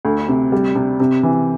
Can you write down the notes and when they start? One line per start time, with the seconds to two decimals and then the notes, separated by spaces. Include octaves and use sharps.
0.05 D2
0.28 C3
0.52 G3
0.75 C3
1.00 C3
1.23 E3